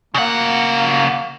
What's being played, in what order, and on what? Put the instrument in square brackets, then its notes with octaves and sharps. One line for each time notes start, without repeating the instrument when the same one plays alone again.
[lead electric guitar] C#3 F#5 [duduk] A#3